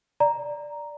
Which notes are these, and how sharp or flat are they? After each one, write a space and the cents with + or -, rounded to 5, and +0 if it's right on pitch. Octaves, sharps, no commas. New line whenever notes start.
D5 +0 A#5 +0